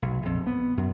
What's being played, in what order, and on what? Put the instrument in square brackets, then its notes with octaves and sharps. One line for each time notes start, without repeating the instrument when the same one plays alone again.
[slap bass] B1
A#1 F2
B3
F#2